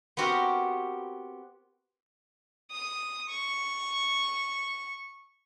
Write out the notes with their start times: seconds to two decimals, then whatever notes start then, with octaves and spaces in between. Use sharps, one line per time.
0.17 B3 C4 F#4 G4 A#4
2.71 D#6
3.30 C#6